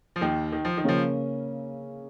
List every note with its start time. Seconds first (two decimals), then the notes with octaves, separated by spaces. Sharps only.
0.16 F3
0.21 D#2 D#3
0.53 D#3
0.65 F3
0.77 D#3
0.84 C#3 F3 A#3 C#4